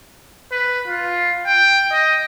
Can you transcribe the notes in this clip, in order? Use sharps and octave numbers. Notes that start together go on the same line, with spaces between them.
B4
F4
G5
D#5